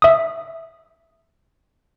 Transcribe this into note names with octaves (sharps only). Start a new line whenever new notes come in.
E5 D#6